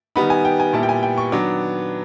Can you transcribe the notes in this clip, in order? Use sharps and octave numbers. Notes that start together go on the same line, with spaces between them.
D#3 G3 B3 D#4 B5
G#5
G5
G#5
A#2 G3 B3 E4 A5
G5
G#5
G5
C#6
D#3 F#3 B3 D4 D6